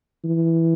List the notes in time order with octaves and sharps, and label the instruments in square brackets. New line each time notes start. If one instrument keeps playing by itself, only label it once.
[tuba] E3